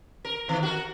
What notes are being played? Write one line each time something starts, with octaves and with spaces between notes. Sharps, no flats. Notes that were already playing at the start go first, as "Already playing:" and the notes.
A#4
F2 D#3
F#4 A#4